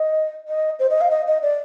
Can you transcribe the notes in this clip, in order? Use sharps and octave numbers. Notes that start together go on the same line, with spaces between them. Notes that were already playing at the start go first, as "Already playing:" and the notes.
Already playing: D#5
D#5
C5
D#5
F5
D#5
D#5
D5